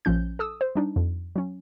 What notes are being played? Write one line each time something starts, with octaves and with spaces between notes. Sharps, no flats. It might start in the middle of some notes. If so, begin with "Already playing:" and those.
A#1 F3 C#4 G6
A4 D#6 E6
C5
G3 D4 D#4
F2
F#3 C#4